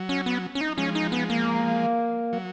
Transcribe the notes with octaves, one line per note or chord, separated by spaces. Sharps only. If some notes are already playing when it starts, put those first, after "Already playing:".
Already playing: F#3
C#4
B3
C#4
D#4
F3 G#3 C#4
D#4
B3
A#3
F#3